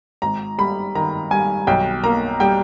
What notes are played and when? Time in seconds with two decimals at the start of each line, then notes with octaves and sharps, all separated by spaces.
0.22 G#1 A#5
0.58 G3 B5
0.95 D#3 A#5
1.31 G2 G#5
1.67 B1 G5
2.04 A#3 A#5
2.40 G3 G5